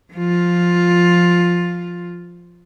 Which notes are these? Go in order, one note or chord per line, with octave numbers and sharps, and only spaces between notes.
F3 F4